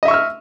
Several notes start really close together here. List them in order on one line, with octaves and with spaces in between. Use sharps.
D#5 E5 C#6 E6 F6